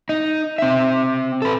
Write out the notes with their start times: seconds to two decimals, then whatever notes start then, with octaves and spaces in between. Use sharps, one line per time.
0.09 D#4
0.58 C4 E5
1.42 A4 B4